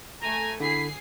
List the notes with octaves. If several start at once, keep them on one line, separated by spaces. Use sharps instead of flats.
A3 G#5 A#5
D3 E4 G#4 C7